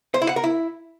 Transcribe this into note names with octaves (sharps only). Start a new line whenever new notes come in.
C5
E4
F#5
A#4
E4